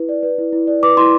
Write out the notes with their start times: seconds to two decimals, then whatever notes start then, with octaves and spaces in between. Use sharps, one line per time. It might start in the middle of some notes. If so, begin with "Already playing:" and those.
Already playing: E4 B4
0.09 D5
0.23 B4
0.38 E4
0.53 E4
0.67 D5
0.83 B4 D6
0.97 E4 C6